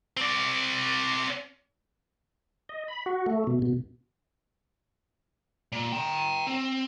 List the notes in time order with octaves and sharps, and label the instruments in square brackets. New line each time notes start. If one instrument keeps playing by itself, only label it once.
[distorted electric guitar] C4 D5
[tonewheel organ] D#5
B5
F#4
A3
B2
B2
[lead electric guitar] A#2
G5 A#5
C4